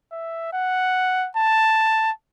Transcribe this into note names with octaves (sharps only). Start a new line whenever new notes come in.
E5
F#5
A5